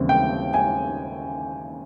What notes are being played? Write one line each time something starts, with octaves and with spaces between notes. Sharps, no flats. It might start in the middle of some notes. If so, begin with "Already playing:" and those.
Already playing: D#2 C#3 E3 G3 C4
G5
G#5